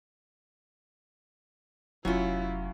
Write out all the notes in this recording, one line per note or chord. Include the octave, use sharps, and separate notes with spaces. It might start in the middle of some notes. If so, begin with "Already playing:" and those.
F1 F#3 C#4 E4 F4 C#5